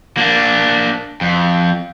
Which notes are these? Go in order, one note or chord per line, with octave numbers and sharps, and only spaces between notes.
A#3 D4
F2